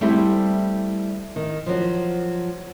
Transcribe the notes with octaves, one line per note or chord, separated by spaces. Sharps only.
G3 A3 C4 E4
D#3
F3 F#3